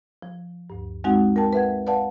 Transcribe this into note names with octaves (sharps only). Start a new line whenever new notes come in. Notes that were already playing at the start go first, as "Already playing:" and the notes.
F3
D2 G2
G#3 C4 D#4 F#4 F#5 G#5
A#4 G5 A5
B4 E5 F#5 G#6
B4 D5 F5 F#5 A5